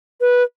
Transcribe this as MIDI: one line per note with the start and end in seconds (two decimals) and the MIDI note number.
0.21 0.43 71